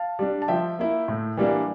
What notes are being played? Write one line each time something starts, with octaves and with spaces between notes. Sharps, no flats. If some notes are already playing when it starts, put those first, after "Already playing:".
Already playing: F5 A5
G3 D4
A5
F3 E5 G5
A#3 E4
A2
E3 G3 A#3 D4